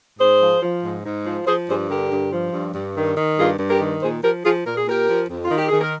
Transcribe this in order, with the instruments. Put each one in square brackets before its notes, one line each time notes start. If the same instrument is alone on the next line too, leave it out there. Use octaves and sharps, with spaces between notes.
[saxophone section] G#2 G#4 C5
F3
F3
G#2
G#2
F3
F3 G#4 C5
G2 G#4 C5
D3 G4 A#4
G2
F3
G2
G2
D#3
D#3
G2 F4 G#4
G2
G4 A#4
D#3
A#2 G#4 C5
F3 G4 A#4
F3 F4 G#4
A#2 A#4
G#4
A#2 G4 A#4
F3
F2
F4
D#3
G4
D#3 G#4
A#4